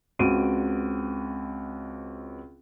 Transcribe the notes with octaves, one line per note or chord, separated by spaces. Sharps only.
C#2 C4 F#4 D7 D#7